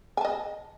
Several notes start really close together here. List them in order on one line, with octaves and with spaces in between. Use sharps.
G#5 A5 D#5